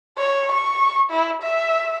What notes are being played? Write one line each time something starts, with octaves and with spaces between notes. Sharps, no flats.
C#5
C#6
E4
E5